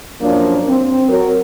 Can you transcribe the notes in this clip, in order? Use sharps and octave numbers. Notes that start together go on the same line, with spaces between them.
F#2 F3 A#3 D4
C4
F#3 A#4